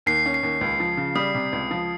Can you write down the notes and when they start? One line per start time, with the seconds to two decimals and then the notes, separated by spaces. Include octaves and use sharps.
0.06 D#2 C7
0.26 C#4
0.34 C7
0.43 D#2
0.61 C#2
0.80 F3
0.97 C#3
1.15 G3 D#6
1.35 C3
1.53 C#2
1.71 F3